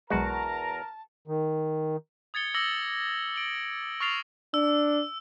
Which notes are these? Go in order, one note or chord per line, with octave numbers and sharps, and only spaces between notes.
B1 E2 G#3 F#4 A#4 A5 A#5
D#3
D#6 G#6 A6 C#7 G7
D6 E6 A#6 C#7 F#7 G7
D7 F#7 G7
C#6 D#6 F6 A6 C7 F7
D4 E6